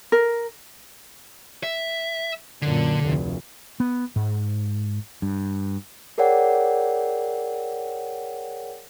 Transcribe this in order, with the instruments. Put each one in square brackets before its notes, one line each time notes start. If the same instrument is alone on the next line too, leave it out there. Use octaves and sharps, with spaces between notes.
[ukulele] A#4
[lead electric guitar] E5
[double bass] F#2 A#2 [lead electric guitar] D3
[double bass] F1 D2
[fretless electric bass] B3
G#2
G2
[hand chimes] G#4 A#4 C#5 D5 F#5 G5